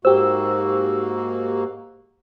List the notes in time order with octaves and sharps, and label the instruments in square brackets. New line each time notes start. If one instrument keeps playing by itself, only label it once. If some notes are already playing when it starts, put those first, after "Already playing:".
[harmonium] G#2 A#3 F#4 [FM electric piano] G4 E6 [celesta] C5